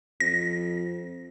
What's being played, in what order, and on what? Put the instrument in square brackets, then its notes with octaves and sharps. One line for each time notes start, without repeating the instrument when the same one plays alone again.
[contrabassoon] F2 [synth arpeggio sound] A#6